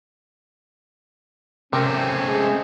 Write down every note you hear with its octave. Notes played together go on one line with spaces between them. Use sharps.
C3 A3 C4 C#4 A#4
G#3